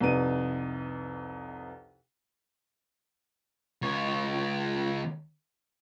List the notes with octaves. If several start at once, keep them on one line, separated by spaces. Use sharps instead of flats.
C2 F2 C3 D#4 B4 D#7
C#2 C#5